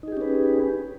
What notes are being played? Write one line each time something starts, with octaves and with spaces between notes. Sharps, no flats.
C#4 D#4 G4 G#4 B4